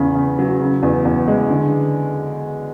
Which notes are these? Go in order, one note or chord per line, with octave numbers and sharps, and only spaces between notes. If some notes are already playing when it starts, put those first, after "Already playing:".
Already playing: E2 C#3
C#3
F#3
C#3
E2
E2
G#3
D3